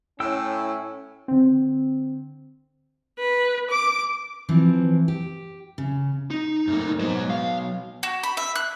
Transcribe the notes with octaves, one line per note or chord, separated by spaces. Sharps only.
A2 C#4 G5 E6
D3 C4
B4
D6
E3 F3 C4
G4
C#3
D#4
F#2 A3 A#3
F#3 G#3 B3 C5
F5
F#4
B5
E5
F#6